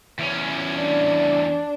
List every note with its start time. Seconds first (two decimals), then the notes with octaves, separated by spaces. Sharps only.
0.19 E2 C#4
0.75 D4